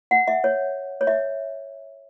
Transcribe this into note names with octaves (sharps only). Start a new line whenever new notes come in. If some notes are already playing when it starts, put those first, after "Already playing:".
F#5
E5
C#5
C#5
E5